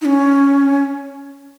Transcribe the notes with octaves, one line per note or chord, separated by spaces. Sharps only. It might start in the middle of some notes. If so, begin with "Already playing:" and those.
D#4
C#4